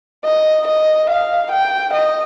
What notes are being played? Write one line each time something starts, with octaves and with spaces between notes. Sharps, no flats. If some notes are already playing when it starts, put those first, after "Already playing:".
D#5
D#5
F5
G5
D#5